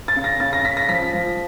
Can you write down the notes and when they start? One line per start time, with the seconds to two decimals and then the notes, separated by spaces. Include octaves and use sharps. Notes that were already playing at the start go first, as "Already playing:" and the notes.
0.08 A6
0.16 C#3
0.24 A#6
0.40 C#3 A6
0.53 A#6
0.65 C#3 B6
0.77 A#6
0.89 F3 B6
1.13 F3